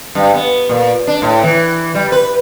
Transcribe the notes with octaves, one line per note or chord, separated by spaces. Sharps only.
G2
B3
A#2
D4
A2
E3
G3
B4